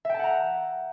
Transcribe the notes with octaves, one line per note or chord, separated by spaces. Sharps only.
E5 F#5 G5 A5 A#5